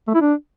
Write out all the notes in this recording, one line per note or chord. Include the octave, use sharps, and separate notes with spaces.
A3
E4
D4